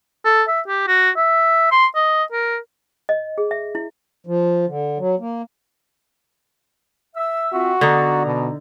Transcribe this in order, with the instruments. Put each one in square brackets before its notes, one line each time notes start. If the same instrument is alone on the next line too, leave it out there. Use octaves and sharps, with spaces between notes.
[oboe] A4
E5
G4
F#4
E5
C6
D#5
A#4
[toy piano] D#5
G#4
E5
E4
[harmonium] F3
D3
F#3
A#3
[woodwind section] E5 E6
[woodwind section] C4 F4 E5 [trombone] F#4
[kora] D3 D#4 [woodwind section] B3 D5 A#5
[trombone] B2